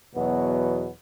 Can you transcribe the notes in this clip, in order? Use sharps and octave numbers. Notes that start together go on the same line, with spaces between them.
E2 B2 F#3 B3